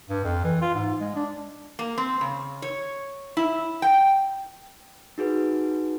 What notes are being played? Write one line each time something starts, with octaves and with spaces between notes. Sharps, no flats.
G2
F2
E3
F4
G#2
G#3
D4
A#3
C4
C#3
C#5
E4
G5
D#4 F#4 G#4 B4